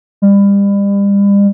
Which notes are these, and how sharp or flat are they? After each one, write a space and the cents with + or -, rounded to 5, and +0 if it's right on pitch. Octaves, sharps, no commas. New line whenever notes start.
G3 +35